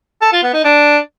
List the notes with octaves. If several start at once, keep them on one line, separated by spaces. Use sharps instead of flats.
A4
F4
B3
D#4
D4